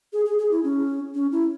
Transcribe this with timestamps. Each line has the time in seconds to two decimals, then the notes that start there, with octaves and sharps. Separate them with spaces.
0.13 G#4
0.25 G#4
0.39 G#4
0.51 E4
0.64 C#4
1.15 C#4
1.32 E4